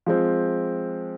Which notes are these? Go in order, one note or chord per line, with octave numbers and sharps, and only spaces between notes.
F3 G#3 C4